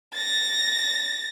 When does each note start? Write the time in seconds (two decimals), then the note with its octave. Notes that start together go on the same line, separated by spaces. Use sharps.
0.14 A6 A#6